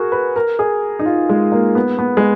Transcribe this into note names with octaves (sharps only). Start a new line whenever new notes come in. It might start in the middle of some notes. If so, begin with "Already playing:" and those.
Already playing: F#4 G#4 A#4
B4
A#4
G#4
D#4
F4
G#3
A#3
B3
B3
G#3